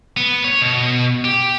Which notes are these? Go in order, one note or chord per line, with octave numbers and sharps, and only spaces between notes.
B3
C#5
B2
G4